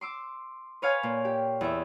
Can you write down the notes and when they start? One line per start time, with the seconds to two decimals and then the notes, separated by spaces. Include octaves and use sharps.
0.01 C6 D6 E6
0.82 B4 C#5 F5 G#5 F6
1.03 A#2
1.25 G4
1.61 E2 E5